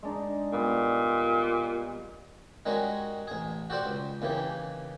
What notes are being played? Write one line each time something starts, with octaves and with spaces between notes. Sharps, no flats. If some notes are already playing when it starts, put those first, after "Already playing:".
G#3 D4 D#4
A#2 G3 B3 G4
D#3 G3 G#3 C#4 F#4
A1 G#4
F#4 G4 A4 C5 D5
C#2
D#2 C#3 E3 G4